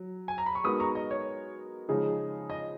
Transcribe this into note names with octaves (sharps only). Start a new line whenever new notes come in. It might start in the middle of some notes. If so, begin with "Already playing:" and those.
Already playing: F#3
G#5
A#5
B5
C#6
G#3 B3 D#4 F#4 A#4 B5 D#6
A#5 C#6
D#5
C#5
C#3 F3 G#3 D#4 G#4
D#5